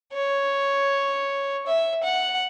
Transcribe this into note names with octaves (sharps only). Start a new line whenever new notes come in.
C#5
E5
F#5